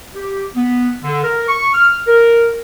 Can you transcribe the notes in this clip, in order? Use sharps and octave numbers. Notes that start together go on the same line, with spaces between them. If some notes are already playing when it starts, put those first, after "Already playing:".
G4
B3
D3
A#4
C#6
F6
A#4